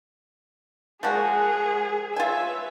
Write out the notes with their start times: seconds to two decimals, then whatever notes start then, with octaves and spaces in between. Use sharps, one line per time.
1.03 F3 G#3 A#3 F#4 G#4 A#4 F#5
2.16 F4 B4 C#5 E5 G#5